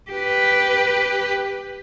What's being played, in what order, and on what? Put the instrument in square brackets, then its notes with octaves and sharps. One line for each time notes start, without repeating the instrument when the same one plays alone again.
[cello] G4 B4